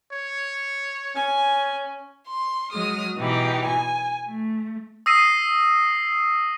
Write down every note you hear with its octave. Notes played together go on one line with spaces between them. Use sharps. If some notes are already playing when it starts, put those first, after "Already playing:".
C#5
C#4 G#5
C6
F#3 G#3 D#6 F6
B2 E3 D#4 G4
G#5
A3
D#6 E6 A#6 C7 D#7